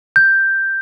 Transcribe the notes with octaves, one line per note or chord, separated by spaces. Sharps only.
G6